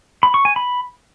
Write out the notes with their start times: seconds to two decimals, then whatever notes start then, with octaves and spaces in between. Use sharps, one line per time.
0.23 B5
0.34 C#6
0.45 G#5
0.56 B5